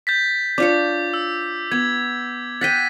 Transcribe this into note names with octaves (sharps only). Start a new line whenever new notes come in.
G6 A6 B6
D4 F4 C#5 D6
E6
B3 G#6
F#5 G5 A6 B6 D#7